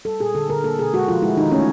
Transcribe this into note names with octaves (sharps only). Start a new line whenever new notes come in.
G3 A4
A#2 G#4
D3 A4
D3 A#4
A#3 A4
B2 G#4
G#3 F#4
F3 F4
G#3 E4
D#3 D#4
A3 C#4